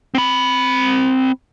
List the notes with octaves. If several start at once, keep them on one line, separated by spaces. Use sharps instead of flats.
C4 B5